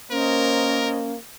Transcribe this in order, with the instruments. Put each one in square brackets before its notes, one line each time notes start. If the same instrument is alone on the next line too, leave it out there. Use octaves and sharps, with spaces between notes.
[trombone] A#3 [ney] C#4 [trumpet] A#4 [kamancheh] C5 D#5